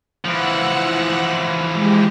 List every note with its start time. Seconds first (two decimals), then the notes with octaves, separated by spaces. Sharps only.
0.25 E3 F3 F#5 E6 F#6
1.72 G#3 G4